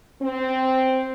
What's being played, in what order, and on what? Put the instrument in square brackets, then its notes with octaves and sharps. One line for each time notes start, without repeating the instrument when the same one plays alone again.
[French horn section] C4